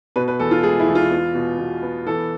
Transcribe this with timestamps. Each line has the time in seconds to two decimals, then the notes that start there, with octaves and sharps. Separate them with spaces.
0.16 B2 B4
0.28 B4
0.40 E2 A4
0.51 F4
0.63 G#3 G#4
0.80 E4
0.87 E2
0.95 F4
1.11 B3
1.35 B2
1.58 B2
1.82 B3
2.06 E3 A4